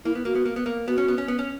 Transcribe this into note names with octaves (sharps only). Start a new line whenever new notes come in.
A#3 E4
B3
A#3 F#4
B3
A#3
B3
A#3
B3 F#4
C#4
B3
C#4
B3
C#4